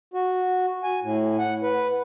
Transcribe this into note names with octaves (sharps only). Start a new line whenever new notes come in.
F#4
G#5
A2
F#5
B4